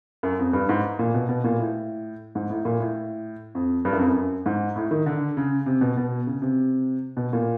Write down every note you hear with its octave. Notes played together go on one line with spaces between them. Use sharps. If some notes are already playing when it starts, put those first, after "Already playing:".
F#2
F2
G2
G#2
A#2
B2
B2
A#2
A2
G#2
A2
A#2
A2
F2
G2
F#2
F2
F#2
G#2
A2
D#3
D3
C#3
C3
B2
B2
C#3
C3
B2
A#2